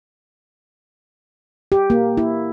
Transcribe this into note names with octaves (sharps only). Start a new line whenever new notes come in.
G4
A#3
E4